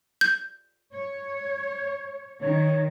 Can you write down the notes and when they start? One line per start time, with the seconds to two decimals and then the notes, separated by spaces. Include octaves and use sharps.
0.21 G6
0.93 C#5
2.42 D#3 C#5